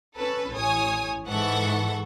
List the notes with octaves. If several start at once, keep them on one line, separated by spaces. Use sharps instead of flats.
C#4 A4 B4
A1 C#5 G#5 D#6
G#2 E3 A4 F#5 C#6